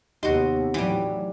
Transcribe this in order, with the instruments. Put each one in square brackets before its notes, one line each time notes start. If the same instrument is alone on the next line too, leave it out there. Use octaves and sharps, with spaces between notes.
[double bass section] D#2 C3 B3 [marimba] D#4 G4 D#5 [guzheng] F#4 C6
[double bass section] A2 F#3 [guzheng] E3 G3